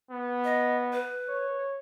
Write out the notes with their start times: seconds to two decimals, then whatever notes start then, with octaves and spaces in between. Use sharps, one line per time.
0.11 B3
0.44 D#5
0.93 B4
1.29 C#5